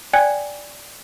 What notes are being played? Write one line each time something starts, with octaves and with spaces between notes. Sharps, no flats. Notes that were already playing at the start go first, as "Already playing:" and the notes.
D5 G5 G#5 F#6 G#6 C#7